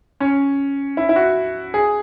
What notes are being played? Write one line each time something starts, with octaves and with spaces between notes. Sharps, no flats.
C#4
E4
E4
F#4
G#4